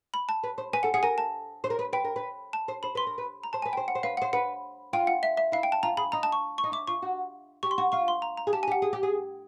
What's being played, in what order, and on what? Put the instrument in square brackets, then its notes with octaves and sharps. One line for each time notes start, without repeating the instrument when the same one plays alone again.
[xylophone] B5
A5
[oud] B4
C5
[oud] B4 [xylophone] G#5
[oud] A4 [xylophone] F#5
[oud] G#4 [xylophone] F#5
[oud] A#4 [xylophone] G#5
[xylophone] A5
[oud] C5
A#4
B4
[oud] B4 [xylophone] G5
[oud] A#4
B4
[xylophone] A5
[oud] C5
[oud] C5 [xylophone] B5
[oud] B4 [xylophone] C6
[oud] A#4
B4
[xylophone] A#5
[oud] C5 [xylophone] A5
[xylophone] G#5
[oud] B4
[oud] C5 [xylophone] G5
[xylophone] F#5
[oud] C5
[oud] B4 [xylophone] F5
[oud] C5 [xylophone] F#5
[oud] B4 [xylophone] F#5
[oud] F4 [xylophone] G5
[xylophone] F#5
E5
E5
[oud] E4 [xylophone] F5
[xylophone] G5
A5
[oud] F4 [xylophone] A#5
[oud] G#4 [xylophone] B5
[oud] D#4 [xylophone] A#5
[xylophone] A5
C#6
C#6
[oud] D#4
[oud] E4 [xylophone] D6
[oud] F4 [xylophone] C#6
[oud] F#4
[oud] G4 [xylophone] C#6
[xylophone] C6
[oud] F#4 [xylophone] C#6
[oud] F4 [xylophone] C#6
[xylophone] C6
A#5
A#5
[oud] G#4
[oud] G4 [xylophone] A5
[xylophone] G#5
[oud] G4
[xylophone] F#5
[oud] G#4
G4
G#4